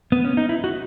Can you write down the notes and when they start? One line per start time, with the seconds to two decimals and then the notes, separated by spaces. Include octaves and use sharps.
0.12 B3
0.25 C#4
0.37 D#4
0.49 E4
0.64 F#4